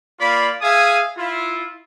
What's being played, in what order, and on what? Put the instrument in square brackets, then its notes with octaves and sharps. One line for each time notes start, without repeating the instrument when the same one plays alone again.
[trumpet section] A#3 F4 D5 B5
G#4 E5 F5 G#5 D#6
E4 F4